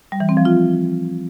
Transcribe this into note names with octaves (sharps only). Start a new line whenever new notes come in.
G3
E3
C4
F3
F4